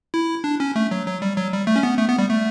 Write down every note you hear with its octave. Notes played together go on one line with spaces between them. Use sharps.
E4
D4
C#4
A3
F#3
F#3
G3
F#3
G3
A3
C#4
B3
A3
B3
G3
A3